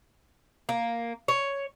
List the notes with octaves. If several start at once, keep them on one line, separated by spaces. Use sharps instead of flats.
A#3
C#5